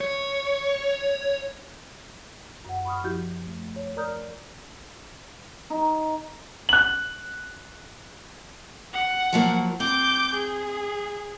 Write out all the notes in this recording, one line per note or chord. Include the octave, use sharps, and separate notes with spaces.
C#5
F#2 F#5
B5 C#6 D#6 F6
F3 E4 F#4 G4 G6
A3
C#5
A#4 D5 A#5 D#6 F6 G6
D#4
F#6 F#7
F#5
F3 F#3 A#3
C4 D6 G6
G#4